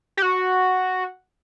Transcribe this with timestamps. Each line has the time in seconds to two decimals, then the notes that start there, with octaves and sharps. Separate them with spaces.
0.17 G4
0.22 F#4